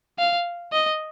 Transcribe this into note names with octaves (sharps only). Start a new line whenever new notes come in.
F5
D#5